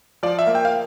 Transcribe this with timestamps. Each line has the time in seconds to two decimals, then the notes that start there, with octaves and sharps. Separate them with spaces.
0.23 F3 D5
0.39 E5
0.47 A#3
0.55 G5
0.65 F5